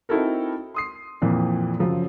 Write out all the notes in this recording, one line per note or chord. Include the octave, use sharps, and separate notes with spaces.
C4 D#4 E4 F#4 A4 A#4
C6 D#6 C7
F2 A#2 E3 C4
F#2 C#3 F3 F#3